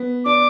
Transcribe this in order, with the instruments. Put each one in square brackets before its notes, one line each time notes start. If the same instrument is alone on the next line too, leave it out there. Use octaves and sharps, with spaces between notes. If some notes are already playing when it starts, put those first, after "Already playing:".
Already playing: [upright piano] B3
[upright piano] D4 [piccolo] D6